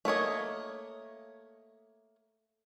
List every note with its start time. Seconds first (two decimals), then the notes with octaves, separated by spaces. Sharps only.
0.05 A3 A#3 C#5 D#5